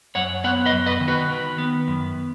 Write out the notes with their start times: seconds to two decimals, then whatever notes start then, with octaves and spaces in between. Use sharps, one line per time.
0.15 F#2 C#5 F#5
0.44 B3 C#5 F#5
0.66 B4 D#5
0.72 F#2
0.86 B4 D#5
1.01 D#3
1.08 F#4 B4
1.29 D#3
1.58 B3
1.88 F#2